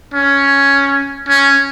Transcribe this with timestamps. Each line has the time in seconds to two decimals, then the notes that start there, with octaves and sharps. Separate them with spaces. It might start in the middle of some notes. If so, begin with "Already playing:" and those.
0.14 C#4
1.29 C#4